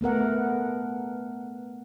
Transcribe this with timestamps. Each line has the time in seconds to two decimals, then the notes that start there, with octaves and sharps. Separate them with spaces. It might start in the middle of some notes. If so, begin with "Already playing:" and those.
0.01 A3 B3 A#4 F#5